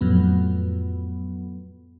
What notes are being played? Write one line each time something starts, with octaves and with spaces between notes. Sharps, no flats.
F2 A2 F#3 B3